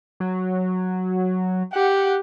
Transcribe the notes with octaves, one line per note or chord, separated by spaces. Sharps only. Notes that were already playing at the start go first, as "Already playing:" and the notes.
F#3
G4 F#5